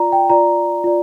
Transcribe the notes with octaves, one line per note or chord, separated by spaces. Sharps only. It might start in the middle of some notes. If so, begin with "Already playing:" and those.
Already playing: F4 D5 A#5
G5
F4 D5 A#5
F4 D5